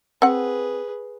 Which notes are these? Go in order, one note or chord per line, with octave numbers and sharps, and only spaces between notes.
C4 G#4 B4 F#5